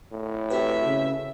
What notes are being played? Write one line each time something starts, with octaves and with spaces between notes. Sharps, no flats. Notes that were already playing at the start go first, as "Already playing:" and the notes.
A2
C4 F#4 G4 B4 E5
C#3